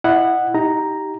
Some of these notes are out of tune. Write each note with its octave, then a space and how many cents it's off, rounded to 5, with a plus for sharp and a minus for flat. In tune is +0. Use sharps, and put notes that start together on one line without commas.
E4 +0 D#5 -30 F#5 +0
D#4 +25 G4 -10 A#5 +0